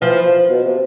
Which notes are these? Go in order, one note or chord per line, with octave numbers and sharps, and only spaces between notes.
E3 F3
F3
B2
C3